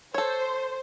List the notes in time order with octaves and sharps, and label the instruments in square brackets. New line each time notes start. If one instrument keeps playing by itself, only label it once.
[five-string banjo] A4 C#5 [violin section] C5